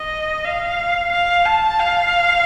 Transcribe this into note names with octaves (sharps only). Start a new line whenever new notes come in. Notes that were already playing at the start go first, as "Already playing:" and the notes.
Already playing: D#5
F5
F5
A5
F5